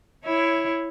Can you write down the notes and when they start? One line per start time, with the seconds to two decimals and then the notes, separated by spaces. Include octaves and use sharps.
0.24 E4 C#5